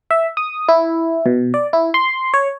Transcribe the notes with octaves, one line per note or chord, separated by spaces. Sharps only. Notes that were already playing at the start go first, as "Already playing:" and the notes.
E5
D#6
E4
B2
D5
E4
C6
C#5